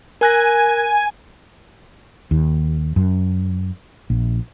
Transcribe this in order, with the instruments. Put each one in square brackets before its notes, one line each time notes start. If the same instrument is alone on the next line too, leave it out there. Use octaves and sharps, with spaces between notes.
[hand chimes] A#4 F#6 A#6 [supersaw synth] G#5
[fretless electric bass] D#2
F#2
A#1